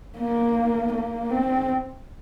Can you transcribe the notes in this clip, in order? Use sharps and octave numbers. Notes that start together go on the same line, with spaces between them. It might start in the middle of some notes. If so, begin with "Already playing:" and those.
A#3
A#3
C4